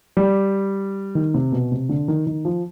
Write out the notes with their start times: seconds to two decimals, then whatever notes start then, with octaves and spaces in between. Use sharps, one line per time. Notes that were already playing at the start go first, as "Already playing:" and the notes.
0.17 G3
1.15 D#3
1.34 C3
1.52 B2
1.72 C3
1.89 D3
2.08 D#3
2.27 D#3
2.45 F3